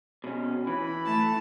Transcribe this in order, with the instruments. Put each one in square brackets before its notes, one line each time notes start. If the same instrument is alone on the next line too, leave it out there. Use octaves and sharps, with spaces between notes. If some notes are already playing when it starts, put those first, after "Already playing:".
[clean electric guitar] B2 C#4
[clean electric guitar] E3 [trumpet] B5
[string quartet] A3 A5